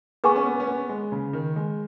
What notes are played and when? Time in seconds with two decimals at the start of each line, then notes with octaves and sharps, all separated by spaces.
0.24 B3 G#4 B4 G#5 C#6
0.36 C#4
0.46 B3
0.60 C#4
0.67 B3
0.89 G#3
1.12 C#3
1.33 D#3
1.56 G#3